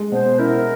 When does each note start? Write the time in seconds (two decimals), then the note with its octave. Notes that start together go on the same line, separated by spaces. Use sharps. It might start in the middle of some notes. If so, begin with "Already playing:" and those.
Already playing: G#3
0.12 B2 C5
0.39 E4 A#4